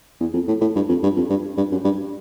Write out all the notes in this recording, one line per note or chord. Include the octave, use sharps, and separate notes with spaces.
E2
F2
A2
A2
G2
F2
G2
F2
G2
G2
F#2
G2